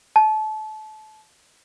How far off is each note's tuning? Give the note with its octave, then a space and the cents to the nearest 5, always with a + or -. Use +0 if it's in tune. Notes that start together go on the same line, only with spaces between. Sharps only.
A5 -30